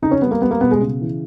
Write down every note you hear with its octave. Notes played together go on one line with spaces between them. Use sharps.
C#3 D#4
C#4
G3 B3
A#3
G3 B3
A#3
B2 B3
G#3
C#3
E3